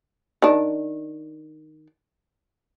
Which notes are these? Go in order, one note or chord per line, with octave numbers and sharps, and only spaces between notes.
D#3 D4